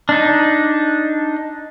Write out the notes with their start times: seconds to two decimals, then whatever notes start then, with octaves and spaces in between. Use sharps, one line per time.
0.09 D4 D#4